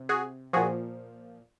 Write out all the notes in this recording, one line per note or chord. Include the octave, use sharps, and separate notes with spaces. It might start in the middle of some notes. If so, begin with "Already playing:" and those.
Already playing: C3
F#4 G#4
A#2 F3 F#4 G#4